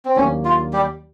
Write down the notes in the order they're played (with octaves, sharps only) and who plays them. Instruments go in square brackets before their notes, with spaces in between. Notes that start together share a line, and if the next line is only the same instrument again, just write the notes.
[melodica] C4
[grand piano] D#2 D#3 F#3 A#3 D4 [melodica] C#4
[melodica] F4
G3 G4